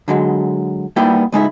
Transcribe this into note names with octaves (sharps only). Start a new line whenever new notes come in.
D3 F#3 G#3
G3 A#3 B3 D#4 E4 G5
C#2 G#3 D#4 E4